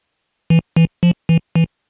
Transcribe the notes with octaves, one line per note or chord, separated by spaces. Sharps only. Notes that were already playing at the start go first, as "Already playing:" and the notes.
E3
E3
F3
E3
E3